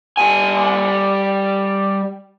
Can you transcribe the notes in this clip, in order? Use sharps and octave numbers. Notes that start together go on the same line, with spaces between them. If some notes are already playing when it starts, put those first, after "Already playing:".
G3 G#5